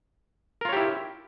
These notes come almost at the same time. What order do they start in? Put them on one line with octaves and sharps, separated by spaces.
A#4 F4 C#5 G4 E4